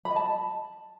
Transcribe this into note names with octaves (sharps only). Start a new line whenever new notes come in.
B5
D#5
A5